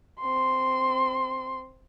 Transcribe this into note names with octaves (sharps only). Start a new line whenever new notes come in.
C4 C6